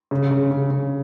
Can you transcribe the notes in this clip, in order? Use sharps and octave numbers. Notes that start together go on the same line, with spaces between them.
C#3
C#3
C#3
C#3